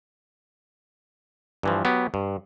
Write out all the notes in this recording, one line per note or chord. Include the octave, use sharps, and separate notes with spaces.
G2 E3 F3
F#3 B3 G4
G2